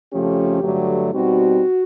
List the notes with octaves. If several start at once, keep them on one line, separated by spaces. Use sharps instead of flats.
F2 C#3 F3 A3 C#4 G4
G2 D3 F#3 A3
B2 G3 C4 D#4 F#4